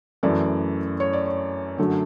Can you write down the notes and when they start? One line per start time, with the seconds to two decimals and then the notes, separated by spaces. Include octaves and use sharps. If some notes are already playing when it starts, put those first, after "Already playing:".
0.23 F#2 E3 A3 D5
1.00 C#5
1.13 D5
1.26 C#5
1.78 F#2 D3 F#3 A3